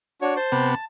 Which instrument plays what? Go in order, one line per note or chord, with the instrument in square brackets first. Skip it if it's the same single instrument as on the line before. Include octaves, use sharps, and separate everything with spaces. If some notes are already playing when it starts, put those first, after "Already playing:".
[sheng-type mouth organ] D4 F#4 [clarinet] C#5
[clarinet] C5 [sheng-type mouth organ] A5
[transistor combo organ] C3 B3